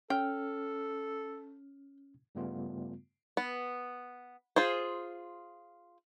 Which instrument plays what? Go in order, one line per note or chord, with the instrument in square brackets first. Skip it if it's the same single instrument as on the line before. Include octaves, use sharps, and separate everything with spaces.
[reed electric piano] C#4 F6 [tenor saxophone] A4 [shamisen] G5
[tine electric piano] G2 C#3 G3 A3 B3 F4
[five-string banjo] B3
F4 G#4 C5